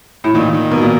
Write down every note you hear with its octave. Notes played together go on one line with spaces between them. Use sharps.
A2
A#2 D#3
D#3
B2 A#3
A#2